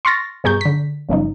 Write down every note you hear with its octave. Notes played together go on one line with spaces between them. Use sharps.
C6 C#6 F6 A6 A#6
G2 B2 G#4 A#5 C#6 G6
D3 B6
G1 C#3 F3 D#4